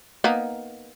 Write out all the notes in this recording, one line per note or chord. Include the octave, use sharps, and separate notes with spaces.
A#3 B3 D#4